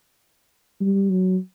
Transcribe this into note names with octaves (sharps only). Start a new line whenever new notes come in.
G3
F#3